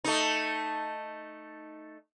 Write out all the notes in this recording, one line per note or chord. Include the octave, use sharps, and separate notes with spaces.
A3 D#4